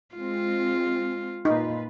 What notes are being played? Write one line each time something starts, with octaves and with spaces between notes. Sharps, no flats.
G#3 C4 F4
A#2 D#4 F4 B4